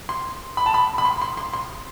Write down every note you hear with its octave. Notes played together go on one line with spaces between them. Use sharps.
C6
B5
A5
B5
B5
C6
C6
C6
C6